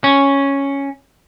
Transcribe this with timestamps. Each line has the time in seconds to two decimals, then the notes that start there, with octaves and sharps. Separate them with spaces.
0.04 C#4